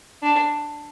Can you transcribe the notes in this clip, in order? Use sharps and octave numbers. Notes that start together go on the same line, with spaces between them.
D4